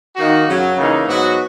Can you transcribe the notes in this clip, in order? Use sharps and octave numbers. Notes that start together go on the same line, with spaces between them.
D#3 A#3 D#4 F#4
F#2 C#3 F#3 C#4 F#4
C#3 E3 A#3 D#4
G#2 F#3 B3 F#4